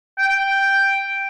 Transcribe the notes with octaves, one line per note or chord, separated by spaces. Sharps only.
G5